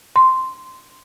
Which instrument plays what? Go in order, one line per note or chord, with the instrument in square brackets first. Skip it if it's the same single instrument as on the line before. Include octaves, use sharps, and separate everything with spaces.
[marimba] C6